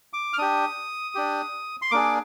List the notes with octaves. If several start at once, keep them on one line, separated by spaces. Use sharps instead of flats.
D6
F6
D4 G4 D#6
D4 G4
C6
A#3 D4 G#4 D6